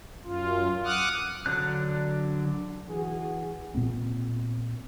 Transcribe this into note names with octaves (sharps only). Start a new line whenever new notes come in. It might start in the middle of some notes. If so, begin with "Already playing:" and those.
F#2 F4
F#5 D6 D#6 F6 F#6
D3 F#3 D4 F#6
E3 F#4 G#4
A#2 B3 C4